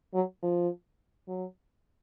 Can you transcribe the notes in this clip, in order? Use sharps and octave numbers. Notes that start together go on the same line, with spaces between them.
F#3
F3
F#3